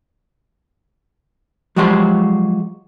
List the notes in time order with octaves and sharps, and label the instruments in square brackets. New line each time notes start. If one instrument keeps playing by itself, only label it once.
[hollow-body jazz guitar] F3 F#3 G#3 F#4 G4 C5